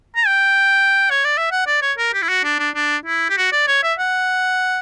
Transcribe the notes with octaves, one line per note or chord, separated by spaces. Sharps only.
A#5
G5
C#5
D5
E5
F#5
D5
C#5
A#4
G4
E4
F#4
D4
D4
D4
E4
G4
F#4
D5
C#5
E5
F#5